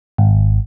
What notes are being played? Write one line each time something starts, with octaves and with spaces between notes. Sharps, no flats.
G#1